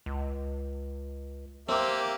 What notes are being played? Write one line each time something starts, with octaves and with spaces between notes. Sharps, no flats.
C#2
A#3 C4 G4 E5